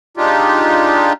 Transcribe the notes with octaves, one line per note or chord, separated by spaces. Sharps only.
G#3 D4 D#4 F4 G4